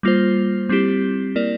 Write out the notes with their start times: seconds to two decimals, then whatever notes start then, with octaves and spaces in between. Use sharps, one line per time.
0.03 G3 A#3 F4 C5
0.69 G3 C4 E4 G4
1.36 A#3 E4 A#4 D5